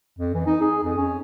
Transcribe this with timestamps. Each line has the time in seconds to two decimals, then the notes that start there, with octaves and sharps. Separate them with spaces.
0.19 F2
0.34 E3
0.46 D#4
0.61 G#4
0.84 F2
0.97 C#4